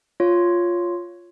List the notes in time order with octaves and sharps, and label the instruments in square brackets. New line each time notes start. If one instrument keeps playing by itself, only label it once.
[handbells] F4 C#5